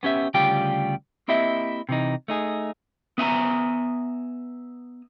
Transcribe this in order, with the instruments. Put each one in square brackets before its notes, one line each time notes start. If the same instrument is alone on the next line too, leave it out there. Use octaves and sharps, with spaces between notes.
[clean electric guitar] B3 C#4 G4 E5
D2 C#3 G3 F4 G4 G5
A#3 C4 E4 G4 D#5 E5
C3 E3 D#4
A3 D#4 G#4
B3 E5 G#5 A#5